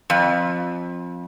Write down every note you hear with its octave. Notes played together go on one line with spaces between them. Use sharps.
F2